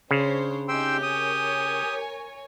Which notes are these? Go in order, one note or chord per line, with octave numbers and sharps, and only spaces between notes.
C#3 D4 C5 C#5
C3 C#4 D#4 G4 G5 C6 E6
A#4 C#5 G#5 D#6